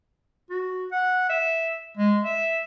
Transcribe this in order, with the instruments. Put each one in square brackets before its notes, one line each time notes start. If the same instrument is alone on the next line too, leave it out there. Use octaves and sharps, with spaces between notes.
[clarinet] F#4
F#5
E5
G#3
E5